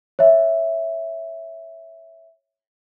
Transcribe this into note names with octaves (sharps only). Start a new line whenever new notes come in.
C#5 E5